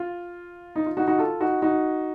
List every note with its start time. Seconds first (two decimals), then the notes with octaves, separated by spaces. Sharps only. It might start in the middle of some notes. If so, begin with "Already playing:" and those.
Already playing: F4
0.76 D#4
0.86 F4
0.97 D#4 F#4
1.08 D#4 F#4
1.18 F4 A4
1.41 D#4 F#4
1.62 D#4 F#4